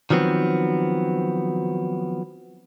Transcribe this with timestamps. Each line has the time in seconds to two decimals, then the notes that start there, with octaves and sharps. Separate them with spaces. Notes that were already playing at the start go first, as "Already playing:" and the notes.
0.10 D#3 F3 F#3 B3 C4